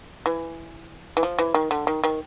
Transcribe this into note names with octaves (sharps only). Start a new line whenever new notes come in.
E3
E3
F3
E3
D#3
D3
D#3
D#3